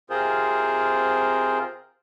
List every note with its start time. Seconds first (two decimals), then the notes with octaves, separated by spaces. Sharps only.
0.10 C3 C4 F4 G#4 A#4 C5